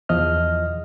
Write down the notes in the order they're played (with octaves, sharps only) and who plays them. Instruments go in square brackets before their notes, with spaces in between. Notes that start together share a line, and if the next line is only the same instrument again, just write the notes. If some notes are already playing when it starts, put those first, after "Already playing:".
[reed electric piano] E2 F3 D#5 F6